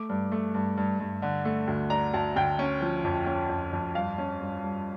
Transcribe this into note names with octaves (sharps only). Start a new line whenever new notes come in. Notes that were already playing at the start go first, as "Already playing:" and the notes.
Already playing: A3 D6
G2
A3
G2
G2
G2
D3
A3
D2
D4 A#5
D2 A5
D2 G5
C#4
F3
F2
C#4
F2
F2
G2 F5
C#4
G2
G2